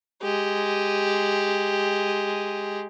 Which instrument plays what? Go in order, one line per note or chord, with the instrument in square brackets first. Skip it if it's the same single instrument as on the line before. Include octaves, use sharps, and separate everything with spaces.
[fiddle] G#3 G4